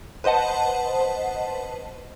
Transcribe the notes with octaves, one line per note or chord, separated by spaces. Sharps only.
B4 C5 D#5 F#5 A5